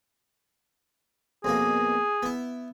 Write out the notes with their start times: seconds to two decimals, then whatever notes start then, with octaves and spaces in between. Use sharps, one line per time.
1.44 F2 B2 A#3 G#4
2.23 B3 E4